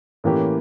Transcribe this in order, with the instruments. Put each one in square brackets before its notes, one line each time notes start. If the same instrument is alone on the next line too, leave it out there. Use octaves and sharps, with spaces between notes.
[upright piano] A2 E3 A#3 C#4 G4